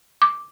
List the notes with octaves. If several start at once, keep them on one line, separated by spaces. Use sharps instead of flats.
D6